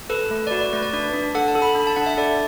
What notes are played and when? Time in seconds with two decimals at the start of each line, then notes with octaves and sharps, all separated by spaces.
0.10 A4 B4
0.31 A3
0.47 D5
0.51 F#4 B4
0.61 D5
0.73 A3 B4
0.83 D5
0.93 D4 D5
1.14 D4
1.35 A4 F#5
1.48 A5
1.55 A4
1.62 B5
1.75 D4 B5
1.87 A5
1.96 D4 F#5
2.06 E5
2.17 A4 D5